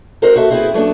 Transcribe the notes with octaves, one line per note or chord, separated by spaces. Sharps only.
D#4 F#4 A#4 C5
F#4 A4 E5
C4 E4 G#4 B4
F#3 A3 B3 D4